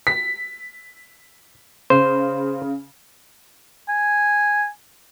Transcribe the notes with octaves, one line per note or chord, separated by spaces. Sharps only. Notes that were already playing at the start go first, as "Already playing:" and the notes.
B6
C#3 C5
G#5